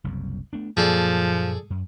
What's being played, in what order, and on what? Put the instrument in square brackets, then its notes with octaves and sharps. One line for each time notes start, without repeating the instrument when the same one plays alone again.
[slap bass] F#1 C2 F#2
A3 B3 D4
[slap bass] F#2 A#2 A#3 [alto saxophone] F3 [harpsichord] G#4 A4 D5
[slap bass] F#2